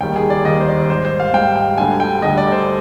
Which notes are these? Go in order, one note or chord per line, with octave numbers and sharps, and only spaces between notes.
D#2 D#3 G3 G5
G#4
D5
D#2 D#3 G3 D#5
C5
D5
G#2 G3 C5
C5
F5
G#2 G3 G5
G5
D2 D3 G3 G#5
G5
D2 D3 G3 D#5
D5
C5